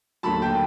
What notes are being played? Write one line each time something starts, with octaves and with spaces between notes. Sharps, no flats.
D#2 D3 F#3 A5 B5
G5 A5